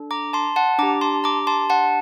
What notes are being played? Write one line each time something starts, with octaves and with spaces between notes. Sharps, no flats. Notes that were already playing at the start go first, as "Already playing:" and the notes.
Already playing: D4 A4
A#5 D6
A5 C6
F#5 A5
D4 G4 A#5 D6
A5 C6
A#5 D6
A5 C6
F#5 A5